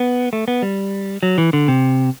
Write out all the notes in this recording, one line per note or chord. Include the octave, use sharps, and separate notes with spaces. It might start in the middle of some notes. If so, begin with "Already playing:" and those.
Already playing: B3
A3
B3
G3
F#3
E3
D3
C3